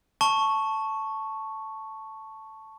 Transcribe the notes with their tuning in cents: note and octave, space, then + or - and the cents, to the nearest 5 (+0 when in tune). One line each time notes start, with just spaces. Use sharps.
A5 +0 C#6 +0